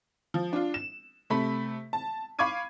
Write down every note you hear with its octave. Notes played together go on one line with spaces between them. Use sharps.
F3
D4 F4
E7
C3 A3 B5 B6
A5
F5 B5 C#6 D6 G#6 D#7